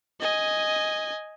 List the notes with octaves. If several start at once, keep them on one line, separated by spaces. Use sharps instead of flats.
D#5 G#5